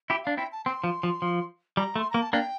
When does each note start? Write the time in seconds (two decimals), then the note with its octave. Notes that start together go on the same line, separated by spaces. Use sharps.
0.09 E4 G4 E5
0.23 D4 F5
0.37 C4 E4 G5
0.52 A5
0.66 C4 C6
0.84 F3
1.03 F3
1.22 F3
1.77 G3 A#5
1.96 A3
1.99 C6
2.10 A#3 A#5
2.22 A5
2.33 A#3 D4 G5